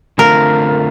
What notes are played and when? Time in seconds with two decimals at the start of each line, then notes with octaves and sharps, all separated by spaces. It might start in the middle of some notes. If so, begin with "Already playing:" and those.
0.18 D3 A3 C4 F4 A#4